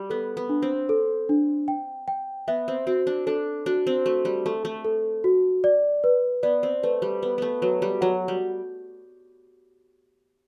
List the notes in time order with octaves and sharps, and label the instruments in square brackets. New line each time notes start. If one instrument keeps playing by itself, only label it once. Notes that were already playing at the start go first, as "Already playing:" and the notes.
Already playing: [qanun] G3
[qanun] B3 [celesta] A4
[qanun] B3
[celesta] D4
[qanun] C4
[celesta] A4
D4
G5
G5
[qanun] B3 [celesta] E5
[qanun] C4
[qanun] C4 [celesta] F#4
[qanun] D4
[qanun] D4 [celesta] A4
[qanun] D4 [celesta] F#4
[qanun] C4
[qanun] A3 [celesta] F#4
[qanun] G3
[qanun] A3 [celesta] A4
[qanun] A3
[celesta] A4
F#4
D5
B4
[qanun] B3 [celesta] D5
[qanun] C4
[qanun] A3 [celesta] B4
[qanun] G3
[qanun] B3 [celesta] B4
[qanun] A3 B3
[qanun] F#3 [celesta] B4
[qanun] G3
[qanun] F#3 [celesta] F#5
[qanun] G3